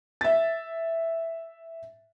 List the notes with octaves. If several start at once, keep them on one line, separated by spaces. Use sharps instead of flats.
E5 A6